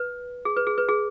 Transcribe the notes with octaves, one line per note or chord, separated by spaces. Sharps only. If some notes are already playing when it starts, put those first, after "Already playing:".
Already playing: B4
G#4
B4
G#4
B4
G#4